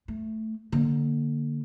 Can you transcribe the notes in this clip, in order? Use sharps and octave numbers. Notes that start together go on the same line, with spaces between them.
A3
D3 A#3